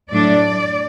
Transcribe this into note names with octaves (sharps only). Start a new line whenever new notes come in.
A2 F#3 A3 D4 D5